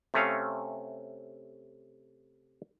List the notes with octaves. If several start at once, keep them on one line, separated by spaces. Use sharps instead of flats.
C3 A3 C#4 F5